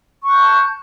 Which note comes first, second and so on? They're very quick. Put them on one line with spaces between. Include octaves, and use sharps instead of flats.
C#6 F#6 G6 A5